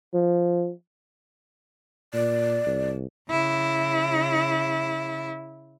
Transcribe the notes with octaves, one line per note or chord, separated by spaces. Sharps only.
F3
A#2 D5
C2
C#3 E4